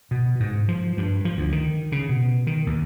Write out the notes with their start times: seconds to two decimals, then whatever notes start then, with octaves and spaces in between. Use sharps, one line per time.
0.11 B2
0.40 G#2
0.68 F3
0.97 G2
1.25 F3
1.37 D2
1.52 D#3
1.92 C#3
2.09 B2
2.47 D#3
2.67 D#2